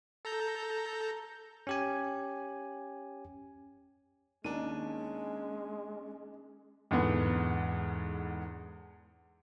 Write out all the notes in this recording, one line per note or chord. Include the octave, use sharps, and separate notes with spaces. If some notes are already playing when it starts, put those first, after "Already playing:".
A4 A#5 G6
C#4 G4 G#5
D#2 G#3 C#4 D4 D#7
E2 G#2 D3 B3